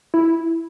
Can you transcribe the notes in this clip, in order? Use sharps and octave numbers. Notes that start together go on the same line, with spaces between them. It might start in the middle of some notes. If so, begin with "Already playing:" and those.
E4